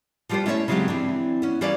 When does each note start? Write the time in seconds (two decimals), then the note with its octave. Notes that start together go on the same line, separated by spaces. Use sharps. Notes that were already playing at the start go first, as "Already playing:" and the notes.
0.29 F3 G3 F4 G4 B4 C5
0.46 A3 C#4 E4 A#4 C#5 E5
0.68 C#3 F3 F#3 G#3 C4 G4
0.88 E3 C4 D4
1.42 B3 C#4
1.61 E3 G3 A#3 C#4 B4 D5